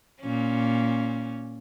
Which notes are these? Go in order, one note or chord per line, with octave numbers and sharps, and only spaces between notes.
A#2 C#4